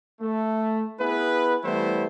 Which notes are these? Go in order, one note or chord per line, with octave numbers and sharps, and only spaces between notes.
A3
B3 E4 G#4 B4
E3 G3 A3 B3 E4 C5